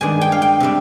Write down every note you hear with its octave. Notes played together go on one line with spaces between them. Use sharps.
G2 D#3 G#3 D4 G#5
G5
F5
G5
C3 G3 D4